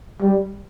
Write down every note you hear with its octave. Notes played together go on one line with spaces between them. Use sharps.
G3